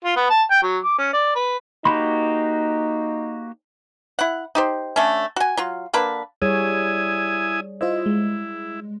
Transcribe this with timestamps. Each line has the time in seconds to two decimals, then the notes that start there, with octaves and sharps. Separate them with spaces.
0.04 F4
0.16 B3
0.30 A5
0.51 G5
0.62 F#3
0.84 D6
0.98 C#4
1.13 D5
1.35 B4
1.85 A#3 D#4 F#4 G4 B5 C6
4.19 E4 F#5
4.55 D#4 G4 C5
4.96 D3 A3 C#4
5.36 F#4 G#5
5.57 F#3 F4
5.93 D3 A#3 D4 B4
6.42 G3 E4 G#4 C#5 G#5 D#6
7.81 E4 F4 C5 D#5
8.06 G#3